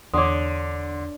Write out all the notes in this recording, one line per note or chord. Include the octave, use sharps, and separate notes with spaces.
E2 D3 C#5 C6 D6 D#6